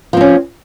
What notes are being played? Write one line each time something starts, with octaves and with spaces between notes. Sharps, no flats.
F3 C4 C#4